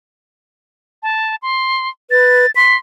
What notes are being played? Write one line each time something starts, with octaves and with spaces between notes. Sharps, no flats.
A5
C6
B4 A6
C6 B6